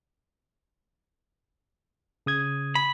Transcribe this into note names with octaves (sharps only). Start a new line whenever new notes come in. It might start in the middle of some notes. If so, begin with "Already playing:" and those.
C#3 D#6 G#6
B5